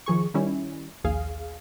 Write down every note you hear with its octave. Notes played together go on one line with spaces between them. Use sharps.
D#3 F3 G#4 C#6
D#3 G3 C#4 E4
A#1 D#2 G#4 F5